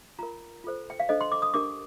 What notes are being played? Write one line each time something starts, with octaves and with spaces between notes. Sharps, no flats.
F4 A#4 A#5
F4 A4 C5
G5
F5
D4 A4 C5 D#5
C6
D6
D#6
D4 G4 A#4 D6